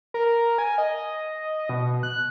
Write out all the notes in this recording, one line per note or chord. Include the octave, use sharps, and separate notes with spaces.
A#4
G#5
D#5
B2
F#6